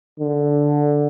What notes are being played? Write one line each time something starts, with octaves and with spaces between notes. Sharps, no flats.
D3